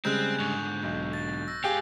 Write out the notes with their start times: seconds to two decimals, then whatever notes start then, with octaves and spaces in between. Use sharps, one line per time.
0.05 C#3 G3 G#3 C4 F#6 G6
0.40 G#2 D3 C#6
0.83 B1
1.13 A6
1.48 E6 A#6
1.64 G#2 G4 G#4 F5 G5